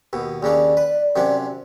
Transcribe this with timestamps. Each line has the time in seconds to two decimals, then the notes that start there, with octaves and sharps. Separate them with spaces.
0.13 D#2 B2
0.43 D#2 C#3 D4 D5
0.77 B4
1.16 F#2 C3 D4